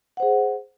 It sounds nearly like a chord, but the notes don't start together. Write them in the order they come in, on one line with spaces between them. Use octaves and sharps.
F#5 C5 G#4